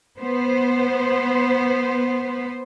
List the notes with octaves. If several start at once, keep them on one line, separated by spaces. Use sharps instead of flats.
B3 C5